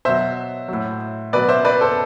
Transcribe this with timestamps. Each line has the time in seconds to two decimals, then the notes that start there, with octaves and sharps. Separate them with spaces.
0.05 B2 F#3 C5 E5
0.69 A2 F#3
1.33 B2 F#3 B4 D5
1.49 C5 E5
1.65 B4 D5
1.81 A4 C5